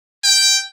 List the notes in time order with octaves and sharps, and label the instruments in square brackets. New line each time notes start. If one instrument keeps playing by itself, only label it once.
[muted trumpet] G5